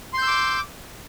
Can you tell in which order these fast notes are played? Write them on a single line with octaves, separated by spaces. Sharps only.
C6 G6 E6 D6